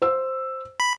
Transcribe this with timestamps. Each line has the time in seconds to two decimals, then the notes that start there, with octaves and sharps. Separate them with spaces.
0.02 C5 E6
0.80 B5